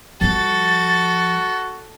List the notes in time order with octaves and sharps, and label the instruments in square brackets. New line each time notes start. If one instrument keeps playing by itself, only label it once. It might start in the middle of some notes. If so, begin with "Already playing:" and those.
[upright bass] F3 G3 [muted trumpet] F#4 [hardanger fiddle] A4 [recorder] A6